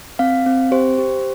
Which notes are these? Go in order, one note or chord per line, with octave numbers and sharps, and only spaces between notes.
C4 F5
C4
G4 C5
G4